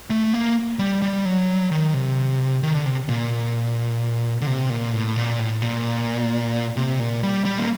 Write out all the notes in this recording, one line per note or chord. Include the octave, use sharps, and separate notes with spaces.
A3
A#3
G3
G3
F#3
D#3
C3
D#3
D3
C3
A#2
D3
C3
A#2
A2
A#2
A2
A#2
C3
A#2
G3
G3
A#3